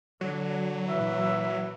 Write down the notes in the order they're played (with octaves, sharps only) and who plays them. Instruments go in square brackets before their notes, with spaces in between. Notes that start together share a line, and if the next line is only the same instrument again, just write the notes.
[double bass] D3 [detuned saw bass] F#3
[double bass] A#2 E3 [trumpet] E5